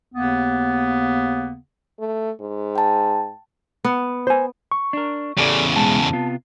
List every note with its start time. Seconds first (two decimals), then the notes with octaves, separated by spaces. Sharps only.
0.15 D#2 C#3 A#3 B3
1.99 A3
2.41 G#2
2.76 G5 A5
3.84 B3
4.27 C5 G#5
4.72 C#6
4.93 D4 A#4
5.38 E2 C#3 G4 A4 D5
5.76 B2 G#3 A5
6.13 C3 B3 F4